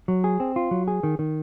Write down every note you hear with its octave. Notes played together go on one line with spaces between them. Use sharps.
F#3
G#4
C4
F4
F#3
G#4
D#3
D#3